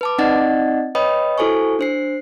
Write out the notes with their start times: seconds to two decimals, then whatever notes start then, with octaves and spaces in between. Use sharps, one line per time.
0.01 B4 A5 D6
0.18 C4 D#4 D5 D#5 F#5 A6
0.95 B4 C#5 D#5 G5 B5 D#6
1.38 E4 F#4 A4 C5 G#5 C#6
1.79 D4 C5 C7